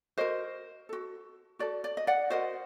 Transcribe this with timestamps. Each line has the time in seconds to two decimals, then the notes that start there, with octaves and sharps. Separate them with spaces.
0.18 F#4 A#4 C5 D#5
0.89 F#4 A4
1.59 F#4 A4 D5
1.84 D5
1.97 D#5
2.07 D5 F#5
2.30 F#4 A#4 C5 D#5